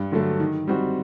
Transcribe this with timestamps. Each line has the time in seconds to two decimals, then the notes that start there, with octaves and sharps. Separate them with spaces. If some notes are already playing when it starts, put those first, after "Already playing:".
Already playing: G2
0.12 D3 F#3 A3
0.40 D#3
0.67 G3 C4 D#4 F#4